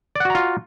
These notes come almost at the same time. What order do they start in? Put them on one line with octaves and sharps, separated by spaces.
D5 F#5 F#4 A#5 F4